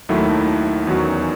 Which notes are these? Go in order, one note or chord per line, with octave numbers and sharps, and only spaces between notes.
D#2 D#3 F#3 A3 E4
E2 D#3 F#3 C#4 F#4